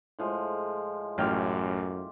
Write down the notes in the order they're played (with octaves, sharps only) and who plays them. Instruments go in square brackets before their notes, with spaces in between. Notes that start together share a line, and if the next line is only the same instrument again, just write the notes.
[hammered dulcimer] A2 F3 G#3
[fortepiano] A1 G5 F6 [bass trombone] F#2 [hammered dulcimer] F4 G4